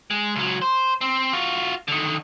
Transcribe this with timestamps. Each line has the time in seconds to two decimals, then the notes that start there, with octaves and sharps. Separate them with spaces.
0.11 G#3
0.35 C#2 F#3
0.62 C5
1.01 C4
1.33 F4 F#4
1.88 D3 D#3